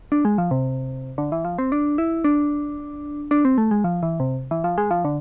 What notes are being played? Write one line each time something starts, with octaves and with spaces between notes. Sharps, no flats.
D4
G#3
F3
C3
D3
E3
F3
C4
D4
E4
D4
D4
C4
A3
G#3
F3
E3
C3
E3
F3
G#3
F3
D3